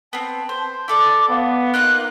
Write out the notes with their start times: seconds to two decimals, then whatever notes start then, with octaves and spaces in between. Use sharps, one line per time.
0.13 B3 C4 A5
0.49 C5
0.88 E4 A4 D5 D6
1.29 B3 F5
1.74 A#3 D#4 F4 F#6